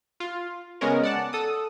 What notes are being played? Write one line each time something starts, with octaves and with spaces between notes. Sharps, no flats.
F4
C#3 G#3 B3 C#4 A#4
D5 F#5 A5
A4 D#6